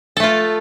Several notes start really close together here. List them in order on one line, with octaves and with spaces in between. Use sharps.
A4 A3 F4